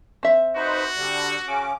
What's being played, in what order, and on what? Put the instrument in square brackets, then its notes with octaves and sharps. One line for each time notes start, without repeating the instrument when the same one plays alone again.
[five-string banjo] C4 E5
[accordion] D#4 B4 C5 [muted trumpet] F#4
[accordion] D3 G3
C#3 C#4 D6